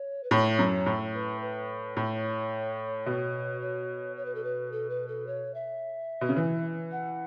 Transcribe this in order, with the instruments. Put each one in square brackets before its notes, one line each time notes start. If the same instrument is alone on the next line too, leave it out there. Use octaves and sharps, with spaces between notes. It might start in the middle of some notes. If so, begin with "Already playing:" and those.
Already playing: [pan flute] C#5
B4
[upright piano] A2 [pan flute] C#5
[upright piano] F#2
A2
[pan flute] B4
B4
[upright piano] A2 [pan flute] C#5
[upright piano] B2
[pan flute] C#5
C#5
B4
A4
B4
A4
B4
A4
C#5
E5
[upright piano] B2
C#3
E3
[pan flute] F#5